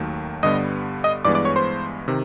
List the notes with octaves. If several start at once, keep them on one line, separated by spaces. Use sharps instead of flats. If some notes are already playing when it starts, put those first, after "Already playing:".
Already playing: D#2 D#3 F#3 A3
G2 D3 G3 B3 D#5 D#6
D#5 D#6
G2 E3 G#3 B3 D5 D6
D5 D6
C#5 C#6
C5 C6
C3 D#3